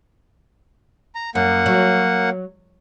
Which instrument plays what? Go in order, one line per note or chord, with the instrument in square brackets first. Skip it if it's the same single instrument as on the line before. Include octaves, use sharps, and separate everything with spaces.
[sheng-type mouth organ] A#5
[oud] F#2 [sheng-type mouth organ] A#3 F#5
[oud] F#3